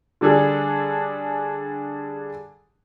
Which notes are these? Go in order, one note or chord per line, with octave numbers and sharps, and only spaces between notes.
D3 G3 D4 G#4 A4